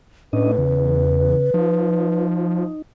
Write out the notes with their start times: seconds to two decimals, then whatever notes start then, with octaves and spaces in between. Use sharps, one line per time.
0.33 A2 C#4 D4 B4 D#5
0.58 E2 C#3
1.54 F3 D#4